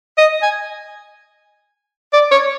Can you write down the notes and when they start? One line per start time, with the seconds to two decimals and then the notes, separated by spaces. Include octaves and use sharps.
0.18 D#5
0.42 G#5
2.13 D5
2.31 C#5